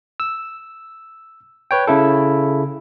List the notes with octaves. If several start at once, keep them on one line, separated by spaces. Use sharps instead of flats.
E6
B4 C#5 G5
C#3 E4 A4